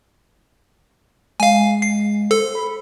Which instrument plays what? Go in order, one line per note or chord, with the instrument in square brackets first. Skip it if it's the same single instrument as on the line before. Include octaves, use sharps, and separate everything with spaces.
[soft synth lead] G#3 [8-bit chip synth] F5 G#5
[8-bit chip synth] C7
[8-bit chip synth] A4 [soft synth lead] C5
[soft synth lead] B5